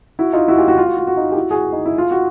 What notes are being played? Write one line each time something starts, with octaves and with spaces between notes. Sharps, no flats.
E4 F#4
D#4 F4
E4 F#4
F4 G4
E4 F#4
F4
F#4
F4
F#4
D#4 F4
G4
E4 F#4
F#4 G#4
D#4
E4
F4
F#4